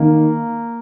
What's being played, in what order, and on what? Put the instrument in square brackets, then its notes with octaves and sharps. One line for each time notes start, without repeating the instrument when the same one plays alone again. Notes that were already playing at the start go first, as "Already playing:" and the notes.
Already playing: [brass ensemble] D#3 [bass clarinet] A#3